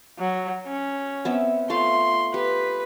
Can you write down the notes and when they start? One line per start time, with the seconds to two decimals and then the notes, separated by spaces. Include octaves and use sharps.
0.19 F#3
0.67 C#4
1.25 B3 C4 E5
1.70 A3 F4 F5 C6
2.34 G4 B4